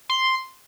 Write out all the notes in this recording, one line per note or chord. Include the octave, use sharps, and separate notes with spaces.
C6